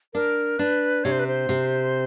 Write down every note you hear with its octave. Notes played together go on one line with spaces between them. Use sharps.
D4 A#4
D4 B4
C3 C#5
C5
B4
C5
C3